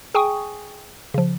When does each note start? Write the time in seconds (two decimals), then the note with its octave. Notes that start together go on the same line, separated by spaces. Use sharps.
0.14 G#4 G5 G#5 C#6 D#6
1.14 C#3 F3